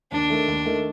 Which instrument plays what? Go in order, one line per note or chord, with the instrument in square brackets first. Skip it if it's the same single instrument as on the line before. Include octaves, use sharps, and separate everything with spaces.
[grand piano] D#2 [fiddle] D4
[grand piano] D#3 A3
D#2
D#3 A3